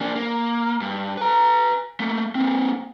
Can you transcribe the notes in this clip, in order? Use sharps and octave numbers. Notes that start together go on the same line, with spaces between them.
A#3 D4
A#3
G2
B4 A#5
A3 A#3
A#3 C4